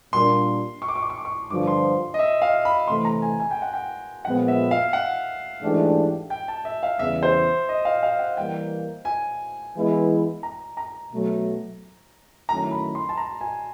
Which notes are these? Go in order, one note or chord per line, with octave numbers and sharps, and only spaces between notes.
A#2 G3 A#3 D4 C6
C#6
D6
C#6
D6
C#6
D6
C#6
G2 D3 F3 D6
C6
D#5
E5
F5
B5
C3 E3 A3 C6
A#5
G#5
G#5
G5
F#5
G5
A#2 F3 G#3 B3 F#5
E5
F5
F#5
G#2 E3 A3 D4 G4
G5
A5
E5
F5
E2 C#3 E3 G3 B3 E5
C5
D#5
F5
F5
F#5
E3 G3 A#3 G5
G#5
E3 G#3 B3 E4
A#5
A#5
B2 F#3 A3
D#3 F#3 A3 C#4 E4 A#5
B5
C6
A5
A#5
G#5